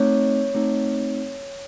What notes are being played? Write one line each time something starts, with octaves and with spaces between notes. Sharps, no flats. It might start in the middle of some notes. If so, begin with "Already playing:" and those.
Already playing: A3 C4 D#4 C#5
A3 C4 D#4